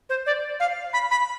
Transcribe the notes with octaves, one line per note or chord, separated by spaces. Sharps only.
C5
D5
F5
B5
B5